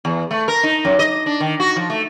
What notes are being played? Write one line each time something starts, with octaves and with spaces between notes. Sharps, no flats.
E2
A3
A#4
D#4
F#2
D#5
D4
D#3
F#4
F3
A3